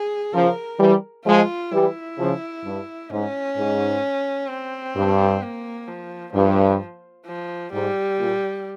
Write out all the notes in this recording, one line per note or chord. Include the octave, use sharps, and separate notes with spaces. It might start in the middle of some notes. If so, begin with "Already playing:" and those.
Already playing: G#4
C#3 F3 A#4
E3 G3
F3 G#3 F4
E3 G3 E4
C#3 F3
G2
G#2 C#4
G#2
C4
G2
A#3
F3
G2 F3
F3
G#2 G3
A#2